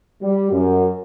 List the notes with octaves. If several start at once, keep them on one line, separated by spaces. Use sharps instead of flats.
G3
F#2